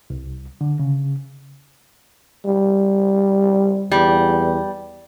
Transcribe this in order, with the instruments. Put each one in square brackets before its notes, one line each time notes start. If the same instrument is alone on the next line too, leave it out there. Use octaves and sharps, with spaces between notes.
[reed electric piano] C2
D3
C#3
[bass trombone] G3
[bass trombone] E2 [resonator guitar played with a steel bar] G3